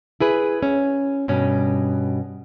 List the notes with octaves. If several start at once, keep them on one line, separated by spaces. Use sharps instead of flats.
E4 G#4 B4
C#4
G2 B2 C#4